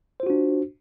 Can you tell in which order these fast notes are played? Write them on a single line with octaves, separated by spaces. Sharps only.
C5 F4 F#4 D4